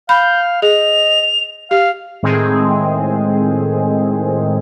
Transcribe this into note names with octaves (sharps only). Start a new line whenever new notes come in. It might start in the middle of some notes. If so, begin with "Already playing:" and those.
F5 B5 G6
G#4 D#5 F7
G4 F5
A2 D#3 G#3 C4 G#4